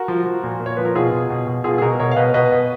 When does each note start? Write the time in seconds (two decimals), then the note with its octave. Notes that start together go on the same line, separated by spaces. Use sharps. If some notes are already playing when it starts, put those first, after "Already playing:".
Already playing: F#4 A#4
0.08 F3
0.26 F3
0.43 A#2
0.60 A#2
0.66 C#5
0.77 F3 B4
0.85 A#4
0.95 B2 F4 G#4
1.12 B2
1.30 B2
1.47 B2
1.64 B2 F4 G#4
1.78 G#4
1.81 B2 F#4 A#4
1.99 B2 A#4 C#5
2.11 F5
2.16 B2 B4 D#5
2.34 B2 B4 D#5
2.52 B2